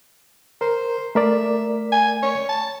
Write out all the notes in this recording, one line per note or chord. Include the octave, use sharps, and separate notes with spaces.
A#4 C5
A3 A#4 D5 E5
G#5
C#5
A5